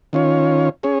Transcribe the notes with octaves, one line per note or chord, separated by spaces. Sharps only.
D#3 C#4 F4 C#5
C#4 G#4 C#5